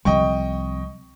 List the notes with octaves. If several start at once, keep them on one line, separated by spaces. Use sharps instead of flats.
C2 F3 D#5 G5 C#6